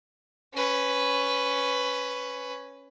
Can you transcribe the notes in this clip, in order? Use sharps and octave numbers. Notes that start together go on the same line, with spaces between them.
C#4 B4